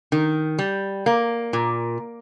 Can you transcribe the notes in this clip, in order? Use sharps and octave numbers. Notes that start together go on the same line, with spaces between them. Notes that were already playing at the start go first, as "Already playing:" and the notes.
D#3
G3
A#3
A#2